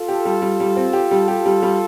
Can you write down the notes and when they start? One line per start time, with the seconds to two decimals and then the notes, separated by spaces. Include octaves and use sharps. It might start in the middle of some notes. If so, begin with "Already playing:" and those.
Already playing: F4 A4
0.08 G4
0.25 G3
0.42 G3
0.60 G3
0.76 C4
0.93 G4
1.11 G3
1.28 G4
1.45 G3
1.62 G3